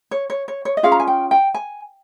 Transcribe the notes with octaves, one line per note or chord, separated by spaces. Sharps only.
C#5
C#5
C#5
C#5
D#5
C#4 F4 G#4 F5
A#5
G#5
G5
G5
G#5